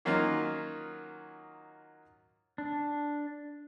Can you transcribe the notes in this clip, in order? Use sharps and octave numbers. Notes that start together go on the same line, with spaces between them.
D#3 F#3 A#3 C#4 D#4 F4
D4